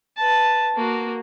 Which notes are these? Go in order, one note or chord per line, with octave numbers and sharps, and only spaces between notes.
B4 A5
A#3 F#4